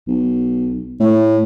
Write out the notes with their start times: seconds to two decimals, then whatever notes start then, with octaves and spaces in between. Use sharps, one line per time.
0.08 B1
1.00 A2